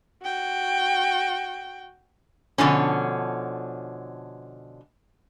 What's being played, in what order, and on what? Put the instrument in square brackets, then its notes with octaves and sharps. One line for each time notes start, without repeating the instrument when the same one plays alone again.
[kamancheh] F#4 G5
[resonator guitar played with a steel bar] B2 D3 F3 C#4